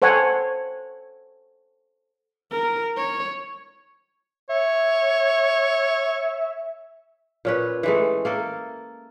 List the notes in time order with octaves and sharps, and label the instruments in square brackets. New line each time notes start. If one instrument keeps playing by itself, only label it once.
[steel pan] A4 C5 C#5 F#5 G#5
[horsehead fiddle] A#4
C#5
[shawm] C#5 [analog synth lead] E5
[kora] A#2 C#4 B4
E3 G#3 A3
A#3 A4 A#4